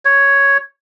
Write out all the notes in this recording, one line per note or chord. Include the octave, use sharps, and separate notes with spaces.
C#5